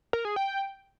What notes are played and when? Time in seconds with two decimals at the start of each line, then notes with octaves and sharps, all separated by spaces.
0.13 A#4
0.25 G#4
0.36 G5